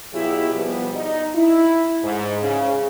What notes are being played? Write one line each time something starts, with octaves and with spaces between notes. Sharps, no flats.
B2 F#3 E4 F4 G4 G#4
B2 F3 G3 B3
D#4
E4
G#2
C#3